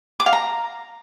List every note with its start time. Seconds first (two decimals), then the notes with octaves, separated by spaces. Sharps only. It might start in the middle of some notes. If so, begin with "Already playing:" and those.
0.20 D6
0.26 F5
0.33 A#5